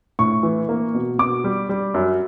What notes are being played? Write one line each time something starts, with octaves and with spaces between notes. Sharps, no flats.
A2 C#6
E3
A#3
B2
B2 D6
G3
G3
F#2